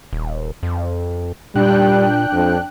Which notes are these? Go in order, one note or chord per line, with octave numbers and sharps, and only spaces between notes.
D#1
F2
A#2 G3 D4 G5 F#6
F2